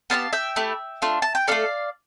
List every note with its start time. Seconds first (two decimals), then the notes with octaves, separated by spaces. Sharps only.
0.10 B3 E4 G4 F5 A5
0.33 E5 G5
0.56 A3 E4 G4
1.02 A3 D4 F4
1.22 A5
1.35 G5
1.47 D4 A4 D5 F5
1.52 A3